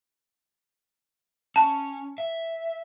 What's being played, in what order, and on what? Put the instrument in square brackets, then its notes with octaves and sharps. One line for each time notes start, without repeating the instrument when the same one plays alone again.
[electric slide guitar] C#4 [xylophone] A5
[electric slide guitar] E5